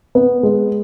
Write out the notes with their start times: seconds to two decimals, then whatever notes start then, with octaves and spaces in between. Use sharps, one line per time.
0.15 B3
0.43 G#3